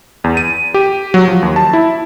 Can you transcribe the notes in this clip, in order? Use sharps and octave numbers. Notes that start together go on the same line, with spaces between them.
E2
D#7
G4
F#3
F3
D#2
A5
E4